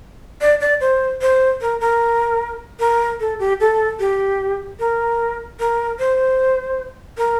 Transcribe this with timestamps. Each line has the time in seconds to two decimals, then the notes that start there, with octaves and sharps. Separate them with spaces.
0.41 D5
0.61 D5
0.81 C5
1.21 C5
1.61 A#4
1.81 A#4
2.80 A#4
3.20 A4
3.39 G4
3.60 A4
4.00 G4
4.79 A#4
5.60 A#4
5.99 C5
7.18 A#4